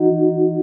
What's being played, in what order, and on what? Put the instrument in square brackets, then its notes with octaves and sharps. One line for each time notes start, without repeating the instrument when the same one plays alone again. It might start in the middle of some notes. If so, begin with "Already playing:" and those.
Already playing: [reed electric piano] E3 D#4 F#4